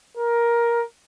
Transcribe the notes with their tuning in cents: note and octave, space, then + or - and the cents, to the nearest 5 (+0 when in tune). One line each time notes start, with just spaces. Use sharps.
A#4 +10